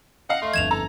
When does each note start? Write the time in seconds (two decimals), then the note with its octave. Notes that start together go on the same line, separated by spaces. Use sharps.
0.29 D#5 F5 F#5
0.42 A3 C6
0.54 G1 F2 G#6 E7 F7
0.71 A4 A#5